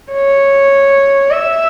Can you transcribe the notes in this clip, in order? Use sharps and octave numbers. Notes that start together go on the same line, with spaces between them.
C#5
E5